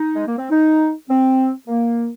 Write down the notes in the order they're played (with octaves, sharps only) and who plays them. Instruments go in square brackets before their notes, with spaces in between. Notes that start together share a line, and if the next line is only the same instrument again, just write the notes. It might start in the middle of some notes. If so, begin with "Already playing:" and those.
Already playing: [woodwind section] D#4
G#3
A#3
C4
D#4
C4
A#3